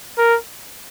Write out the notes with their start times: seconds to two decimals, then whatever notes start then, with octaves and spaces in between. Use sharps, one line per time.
0.18 A#4